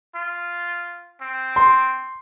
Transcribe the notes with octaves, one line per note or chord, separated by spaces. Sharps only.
F4
C4
C6